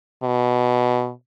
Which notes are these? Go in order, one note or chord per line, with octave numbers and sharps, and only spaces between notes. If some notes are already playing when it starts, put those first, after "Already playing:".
B2